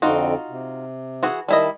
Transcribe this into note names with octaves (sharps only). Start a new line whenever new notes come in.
F2 D3 C4 D#4 F4 F#4
C3
E3 F#4 G#4
D#3 G3 E4 D#5 A5